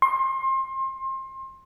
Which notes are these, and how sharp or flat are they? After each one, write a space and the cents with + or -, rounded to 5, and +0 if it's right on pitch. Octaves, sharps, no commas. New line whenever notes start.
C6 +30